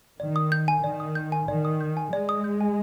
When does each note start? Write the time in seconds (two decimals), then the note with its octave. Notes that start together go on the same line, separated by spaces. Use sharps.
0.20 D#3 D5
0.36 D#6
0.52 G6
0.68 G#5
0.83 D#3 D5
1.00 D#6
1.15 G6
1.32 G#5
1.48 D#3 D5
1.65 D#6
1.81 G6
1.97 G#5
2.12 G#3 D5
2.29 D#6
2.44 G6
2.61 G#5